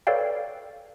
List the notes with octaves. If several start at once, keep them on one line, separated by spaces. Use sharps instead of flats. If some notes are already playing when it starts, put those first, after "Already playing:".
A4 B4 C#5 D5 F5 G5